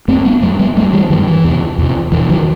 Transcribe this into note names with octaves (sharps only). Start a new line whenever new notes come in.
F#2 A3 C4
G3 B3
F#2 F#3 A3
G3 B3
F#2 F#3 A3
E3 G3
G2 D#3 F#3
E3
E2 C3
E2 C3
E2 B2 E3
D#3 F#3